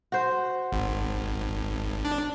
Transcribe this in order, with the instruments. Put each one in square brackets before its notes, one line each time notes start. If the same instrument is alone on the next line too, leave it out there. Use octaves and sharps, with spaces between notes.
[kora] F#4 C5
[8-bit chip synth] G#1
D4